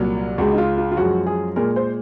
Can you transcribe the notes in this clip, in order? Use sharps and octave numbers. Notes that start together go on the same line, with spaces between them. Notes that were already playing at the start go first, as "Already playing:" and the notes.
Already playing: C2 A#2 F#3 A#3
C#2 C#3 G#3 F#4
D#4
F4
F4
F4
F#2 F3 G#3 F#4
G#4
A#2 G#3 A#4
C5